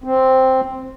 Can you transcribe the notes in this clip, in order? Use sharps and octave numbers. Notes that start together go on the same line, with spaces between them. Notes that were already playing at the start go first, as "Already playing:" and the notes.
C4